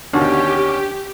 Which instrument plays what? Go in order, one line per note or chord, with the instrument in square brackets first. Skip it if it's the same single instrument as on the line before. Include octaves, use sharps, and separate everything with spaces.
[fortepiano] D#2 B2 D3 [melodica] C#4 [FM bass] D4 [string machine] G4